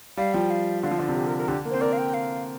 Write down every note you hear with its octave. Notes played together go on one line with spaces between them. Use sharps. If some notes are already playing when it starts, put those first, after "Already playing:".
G3 F5
F3 G5
F5
D3 F5
F3
D3 D5
C3
G4
A#4
A#4
D3 G4
A#3
C4 C5
A#4 D5
F5
G5
F5